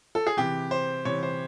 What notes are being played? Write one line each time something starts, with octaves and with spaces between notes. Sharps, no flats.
A4
G#4
C3 E3 G4
C5
C3 E3 C#5
C5